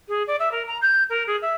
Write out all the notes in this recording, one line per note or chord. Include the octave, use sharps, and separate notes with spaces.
G#4
D5
E5
A#4
A#5
G6
A#4
G#4
E5